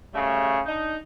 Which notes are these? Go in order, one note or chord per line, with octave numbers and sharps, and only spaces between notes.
C#3 G3 A3
D4 D#4